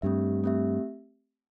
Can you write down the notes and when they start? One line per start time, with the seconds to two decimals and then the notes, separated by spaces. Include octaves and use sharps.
0.02 G2 A3 C4 G4 E5
0.44 A3 C4 G4 E5